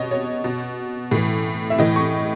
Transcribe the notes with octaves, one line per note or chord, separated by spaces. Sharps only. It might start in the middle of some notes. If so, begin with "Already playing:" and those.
Already playing: B2 C#5 D#5
C#5
B2
A2 E3
E5
A2 E3 D#5
C#6